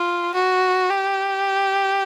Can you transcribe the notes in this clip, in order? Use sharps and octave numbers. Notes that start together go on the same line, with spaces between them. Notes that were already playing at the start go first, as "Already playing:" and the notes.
Already playing: F4
F#4
G4